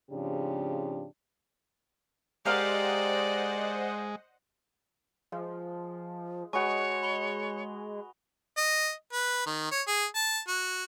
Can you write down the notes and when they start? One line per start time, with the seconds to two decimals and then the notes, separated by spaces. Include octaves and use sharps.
0.10 G#2 C#3 F3 C4 D4 G4
2.45 G#3 G4 A#4 C5 D5 D#5 F5 F#5
5.32 F3 G#3
6.53 G#3 F#4 B4 C#5 D#5 G#5 C#6
7.03 B5 F7 G7
8.57 D#5
9.13 B4
9.46 D#3
9.71 C#5
9.87 G#4
10.15 A5
10.48 F#4